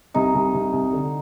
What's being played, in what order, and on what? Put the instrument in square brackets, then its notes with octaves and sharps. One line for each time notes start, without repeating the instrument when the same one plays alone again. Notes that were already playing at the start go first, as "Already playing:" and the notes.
[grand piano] C2 [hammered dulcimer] D#4
[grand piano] C2
C2
C2
D3